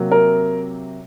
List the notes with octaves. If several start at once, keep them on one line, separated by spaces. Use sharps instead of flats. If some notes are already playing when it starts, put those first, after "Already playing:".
Already playing: C3 F#3 A#3
A#4